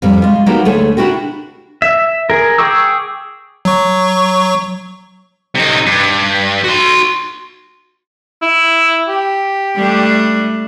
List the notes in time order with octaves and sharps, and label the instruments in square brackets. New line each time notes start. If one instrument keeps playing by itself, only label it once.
[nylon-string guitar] F2 C3 G3
G#3 F4
F#3 A#3 B3 D#4 F#4 G4
D2 A3 G#4 C#5
D4 E4 F#4 G4 A#4
[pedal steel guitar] E5
G#4 A#4
G#4 G5 C#6 D6 E6
[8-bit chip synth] F#3 C#6
[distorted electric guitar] C3 D#4
G2
F#4 C6
[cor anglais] E4
G4
[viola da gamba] G3 A3 D4